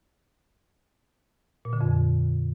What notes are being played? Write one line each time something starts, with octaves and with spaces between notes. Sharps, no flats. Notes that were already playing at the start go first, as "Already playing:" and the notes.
A#2
D3
F2